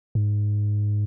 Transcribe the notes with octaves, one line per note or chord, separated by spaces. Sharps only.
G#2